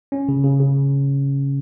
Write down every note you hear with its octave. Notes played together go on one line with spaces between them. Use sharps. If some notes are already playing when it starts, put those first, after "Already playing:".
C#4
C#3
C#3
C#3